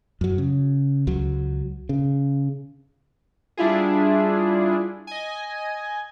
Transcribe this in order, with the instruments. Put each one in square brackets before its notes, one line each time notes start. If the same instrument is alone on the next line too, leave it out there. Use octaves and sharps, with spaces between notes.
[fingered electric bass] F#2 F#3
C#3
C#2 F#3
C#3
[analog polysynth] G3 D4 E4 F4 G#4
D#5 G#5